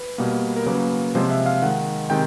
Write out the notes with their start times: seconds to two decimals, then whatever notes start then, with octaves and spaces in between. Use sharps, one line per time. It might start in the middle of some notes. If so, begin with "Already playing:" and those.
Already playing: B4
0.18 B2 G3 A#3
0.56 A#4
0.66 C#3 F#3 A#3 B4
1.15 C3 F3 G#3 C5
1.30 E5
1.46 F5
1.62 D#3 G#3 F#5
2.10 C3 D#3 G#3 G5